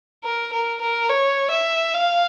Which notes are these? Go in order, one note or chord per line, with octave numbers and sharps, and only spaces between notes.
A#4
A#4
A#4
C#5
E5
F5